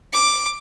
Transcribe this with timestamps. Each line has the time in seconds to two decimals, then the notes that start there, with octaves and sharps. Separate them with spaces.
0.13 D6